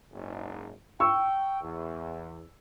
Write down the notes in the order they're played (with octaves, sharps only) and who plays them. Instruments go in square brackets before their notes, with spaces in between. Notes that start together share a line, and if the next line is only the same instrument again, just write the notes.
[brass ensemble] F#1 G#2
[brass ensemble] G5 [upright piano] C#6 E6
[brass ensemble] E2